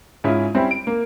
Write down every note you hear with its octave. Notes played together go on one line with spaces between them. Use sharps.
G#2 C#4 E4 F4 G#4
G3 C4 C#4 E4
D7
A#3